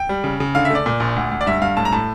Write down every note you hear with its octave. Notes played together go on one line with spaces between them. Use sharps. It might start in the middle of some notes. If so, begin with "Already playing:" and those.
Already playing: G5
G3
C#3
C#3
D3 F5
E5
A3 D5
A#2
A#1
D2
D2
D5
G2 E5
G2 F5
A2 A5
A#5
A2 A5